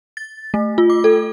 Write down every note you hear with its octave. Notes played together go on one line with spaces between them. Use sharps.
A6
A3
F4
D6
A4